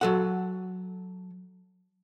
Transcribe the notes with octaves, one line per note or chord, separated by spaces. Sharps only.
F#3 A4 F#5